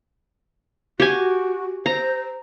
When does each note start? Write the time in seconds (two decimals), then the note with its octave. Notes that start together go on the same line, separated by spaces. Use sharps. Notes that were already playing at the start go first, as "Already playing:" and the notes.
1.00 F#4 G4 G#5
1.86 C5 A#5